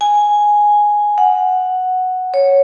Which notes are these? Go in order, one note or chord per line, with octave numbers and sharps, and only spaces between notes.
G#5
F#5
C#5